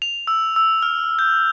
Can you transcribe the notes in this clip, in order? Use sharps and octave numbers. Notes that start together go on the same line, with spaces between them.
F7
E6
E6
F6
G6